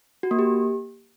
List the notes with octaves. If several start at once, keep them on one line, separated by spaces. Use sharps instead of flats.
F#4
A#3
G4